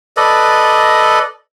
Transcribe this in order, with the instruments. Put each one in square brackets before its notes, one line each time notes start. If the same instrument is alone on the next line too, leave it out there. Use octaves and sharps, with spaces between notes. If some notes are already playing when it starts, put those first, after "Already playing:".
[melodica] A4 B4 D5 D#5